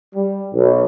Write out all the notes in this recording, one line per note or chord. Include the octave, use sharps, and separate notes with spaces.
G3
B1